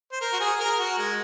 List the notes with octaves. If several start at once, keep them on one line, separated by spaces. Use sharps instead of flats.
C5
A#4
F#4
G#4
A#4
F#4
G#3